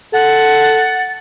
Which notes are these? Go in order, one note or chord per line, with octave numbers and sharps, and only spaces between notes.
A4 F#5 A6